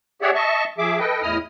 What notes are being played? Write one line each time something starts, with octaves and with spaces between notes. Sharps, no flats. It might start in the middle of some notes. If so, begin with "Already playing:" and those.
G4 G#4 C#5 D5 E5 F#5
D#5 E5 A5 C#6
F3 G#4 E5 D6
A4 B4 D#5 G5
E2 A2 E4 D#5 D#6 F6